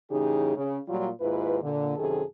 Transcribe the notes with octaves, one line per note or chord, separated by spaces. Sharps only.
A2 C#3 E3 D#4 G4 G#4
C#3
A#2 F#3 G3 F4
D#2 G#2 E4 F4 B4
A#2 D3
F#2 C3 D#3 G#4 A4